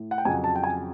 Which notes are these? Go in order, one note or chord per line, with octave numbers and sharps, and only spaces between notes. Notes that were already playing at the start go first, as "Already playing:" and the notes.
Already playing: A2
F#5
G5
F2 C#3 F#3 G#5
A5
G5
G#5